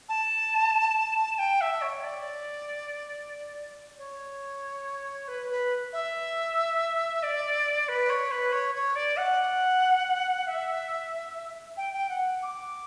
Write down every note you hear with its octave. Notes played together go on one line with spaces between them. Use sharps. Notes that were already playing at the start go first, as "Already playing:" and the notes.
A5
G5
E5
C#5
D5
C#5
B4
B4
E5
D5
B4
C#5
B4
C#5
C#5
D5
F#5
E5
G5
G5
F#5
D6